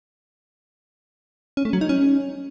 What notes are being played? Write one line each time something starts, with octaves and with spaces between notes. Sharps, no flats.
C#4
A3
F#3
D#4
C#4